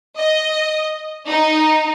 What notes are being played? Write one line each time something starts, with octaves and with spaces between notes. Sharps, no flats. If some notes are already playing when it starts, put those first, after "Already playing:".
D#5
D#4